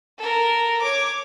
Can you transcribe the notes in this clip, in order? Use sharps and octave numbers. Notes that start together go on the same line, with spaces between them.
A4 A#4
C#5 D6